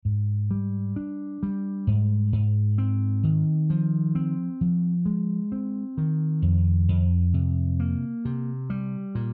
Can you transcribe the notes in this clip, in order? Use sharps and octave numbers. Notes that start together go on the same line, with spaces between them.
G#2
G3
D4
G3
G#2
G#2
C4
D#3
F3
C4
F3
G#3
C4
D#3
F2
F2
C3
A#3
C3
G3
A#2